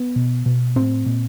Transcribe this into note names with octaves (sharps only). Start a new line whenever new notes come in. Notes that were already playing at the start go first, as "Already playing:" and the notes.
Already playing: B3
B2
B2
A2 C4
A#2